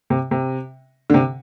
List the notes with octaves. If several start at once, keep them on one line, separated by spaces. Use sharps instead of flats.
C3
C3
D3
C3